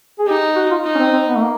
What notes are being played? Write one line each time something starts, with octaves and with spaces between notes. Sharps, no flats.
G#4
D#4 G4
F#4
F4
D#4
C#4
C4
C4
B3
A3
A#3